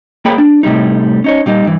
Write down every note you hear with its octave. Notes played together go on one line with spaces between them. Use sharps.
A#3 G#4 C#5 G5 B5
D4
A2 C3 G3 D#4
C#4 D#4 C#5
A#2 G3 D#4
G2 E3